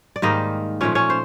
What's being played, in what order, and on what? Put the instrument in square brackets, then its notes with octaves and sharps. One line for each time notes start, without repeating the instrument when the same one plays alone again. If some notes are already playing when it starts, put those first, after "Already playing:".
[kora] D5
G#2 D#3 G3 A#3 D#4 D#5
A#2 F3 A3 C#4 C#5
C#4 C#5
C5